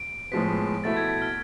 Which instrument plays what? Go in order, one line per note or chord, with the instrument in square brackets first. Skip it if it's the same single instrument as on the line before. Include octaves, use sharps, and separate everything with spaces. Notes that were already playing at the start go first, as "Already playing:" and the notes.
Already playing: [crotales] D7
[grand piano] A2 F3 G#3 B3 [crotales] B6
[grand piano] B2 A3 E4 [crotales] A6
[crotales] G#6
G#6
F6